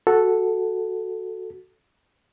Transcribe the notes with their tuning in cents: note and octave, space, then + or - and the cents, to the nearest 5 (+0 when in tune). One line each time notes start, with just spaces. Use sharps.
F#4 +0 A4 +0